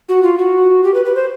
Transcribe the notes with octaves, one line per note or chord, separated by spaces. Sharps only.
F#4
F4
F#4
G4
B4
B4
C5